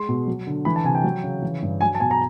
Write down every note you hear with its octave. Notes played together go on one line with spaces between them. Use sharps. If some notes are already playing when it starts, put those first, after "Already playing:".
Already playing: G#3 C6
B2
F#3
D3
E3 B5
A5
C3 G#5
G5
F#3
C#3
E3
G2
F#3 G#5
A5
B2 G#5
A#5